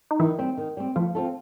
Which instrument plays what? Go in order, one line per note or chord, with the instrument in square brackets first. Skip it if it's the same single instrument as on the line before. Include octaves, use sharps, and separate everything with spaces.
[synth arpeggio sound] D#4
[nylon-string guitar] D#3 [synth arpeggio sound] E3 E4
[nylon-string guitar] G3 C4
D#3
G3 C4
[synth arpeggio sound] F3 F4 [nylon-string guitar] A3
[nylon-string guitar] C4 F4 A4